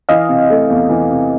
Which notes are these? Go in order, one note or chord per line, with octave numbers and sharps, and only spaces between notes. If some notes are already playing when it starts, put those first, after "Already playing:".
E3 D#5 F5
C3
A3
E2
E3
C3